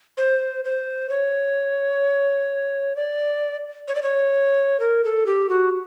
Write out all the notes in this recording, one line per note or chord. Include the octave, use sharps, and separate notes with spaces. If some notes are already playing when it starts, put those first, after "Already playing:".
C5
C5
C#5
D5
C#5
D5
C#5
A#4
A4
G4
F#4